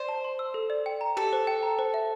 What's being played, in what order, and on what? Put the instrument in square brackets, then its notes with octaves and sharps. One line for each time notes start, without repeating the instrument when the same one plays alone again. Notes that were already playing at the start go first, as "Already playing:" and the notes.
Already playing: [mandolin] C5 [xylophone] D5
[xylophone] A5
C6
E6
A4
D5
G5
A#5
[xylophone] G4 [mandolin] A4
[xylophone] C5
G5
A#5
C5
E5